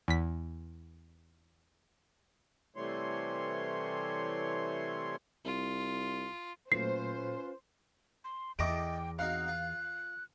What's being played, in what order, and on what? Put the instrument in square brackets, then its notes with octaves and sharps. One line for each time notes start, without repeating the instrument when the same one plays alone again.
[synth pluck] E2 B6
[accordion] C3 E3 G3 A3 C#5 C6
[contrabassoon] C2 [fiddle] F4
[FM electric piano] A#2 F#3 A3 [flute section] C#4 F4 B4 [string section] C5 [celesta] C7
[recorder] C6
[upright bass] E2 [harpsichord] A4 D#5 E5 [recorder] G5 [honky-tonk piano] D6 A#6 D7
[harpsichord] C4 D#4 F#4 [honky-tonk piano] F5 [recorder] F#6
[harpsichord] F4